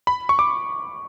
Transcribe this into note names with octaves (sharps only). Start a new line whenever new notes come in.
B5
C#6
D6